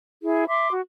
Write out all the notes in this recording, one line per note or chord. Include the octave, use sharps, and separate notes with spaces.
E4 G#4
E5 C6 D6
F#4